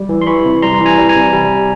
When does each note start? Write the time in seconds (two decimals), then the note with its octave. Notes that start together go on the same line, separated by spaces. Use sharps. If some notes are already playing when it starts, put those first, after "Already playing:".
Already playing: G3
0.09 E3
0.22 C6
0.27 E3 B5 C#6
0.45 C3
0.62 G3 A#5 C6
0.80 E3
0.86 G#5 A#5
0.98 G3
1.09 G#5 A#5
1.16 C3
1.33 G3